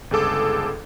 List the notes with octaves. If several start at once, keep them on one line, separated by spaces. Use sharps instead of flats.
G1 C#2 G#4 A4 D6